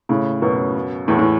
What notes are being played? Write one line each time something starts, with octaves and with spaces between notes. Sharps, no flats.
A2 C#3
F#2 B2
E2 A2
A2